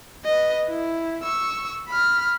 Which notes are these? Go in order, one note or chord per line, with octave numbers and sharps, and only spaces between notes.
B4 D#5
E4
C#6 E6
B5 F6